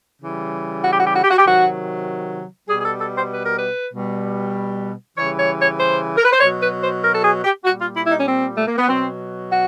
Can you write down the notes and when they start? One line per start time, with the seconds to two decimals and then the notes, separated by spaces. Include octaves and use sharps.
0.21 C#3 E3 G3
0.84 F#4
0.91 G4
0.99 F#4
1.07 G4
1.15 F#4
1.23 G4
1.31 F#4
1.39 G4
1.46 C3 D#3 F#3 F#4
2.69 B2 G3 G#4
2.80 G#4
2.85 A4
3.00 A4
3.16 C5
3.31 B4
3.45 A#4
3.58 B4
3.93 B2 G3
5.17 C#3 E3 G3 C#5
5.38 C#5
5.61 C#5
5.78 C5
6.17 A#4
6.25 B4
6.32 C5
6.41 B2 F#3 C#5
6.61 B4
6.82 C5
7.03 A#4
7.13 A4
7.24 G#4
7.44 G4
7.65 A#2 G3 F#4
7.80 F4
7.96 E4
8.06 E4
8.11 D#4
8.19 C#4
8.27 C4
8.56 A3
8.67 A#3
8.78 B3
8.88 B2 F#3 C4
9.51 F#4